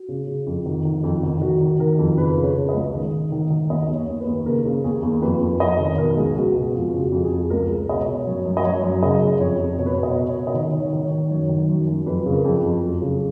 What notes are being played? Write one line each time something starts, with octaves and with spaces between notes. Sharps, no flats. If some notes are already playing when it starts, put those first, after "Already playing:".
Already playing: F#4
C#3
C#3
F2
D#3
D#3
F2
D#3
D#3 F#4
D#3
D#3 A#4
F2
C#3 B4
C#3 B4
C#5
C#3
D#5
C#2
D#3
D#3
D#3
D#3
D#2 D#5
D#2
C#5
D#2
B4
D#2
C#3 A#4
C#3
D#2 G#4
D#2
F2 B4
F2
F2 D#5
D#3
B2 A#4
C#2 G#4
C#2 F#4
B2
F2 F4
C#3 G#4
F#4
F2
G#4
F2
C#2 A#4
C#2
B2 D#5
C#5
B2
F#2 C#5
F#2
D#5
F#2 C#5
F#2
C#3 D#5
C#3
F2 C#5
F2
B2 C#5
B4
C#5
B2
D#5
B2
C#5
B2
D#5
D#3 C#5
D#3
C#5
D#3
C#5
D#3
F#2 C#5
D#3
F#2
F#2
F2 B4
C#3
A#4
F2
F2
F#2
C#3